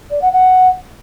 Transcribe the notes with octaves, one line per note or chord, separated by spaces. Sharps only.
D5
F#5
F#5